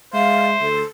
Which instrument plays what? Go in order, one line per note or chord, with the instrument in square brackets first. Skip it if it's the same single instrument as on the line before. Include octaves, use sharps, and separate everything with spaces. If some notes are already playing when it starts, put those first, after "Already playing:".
[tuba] G#3 [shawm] C5 [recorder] E5 [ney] F5
[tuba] D2 [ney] A4